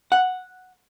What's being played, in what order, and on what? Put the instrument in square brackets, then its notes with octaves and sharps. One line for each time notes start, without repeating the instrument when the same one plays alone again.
[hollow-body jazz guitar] F#5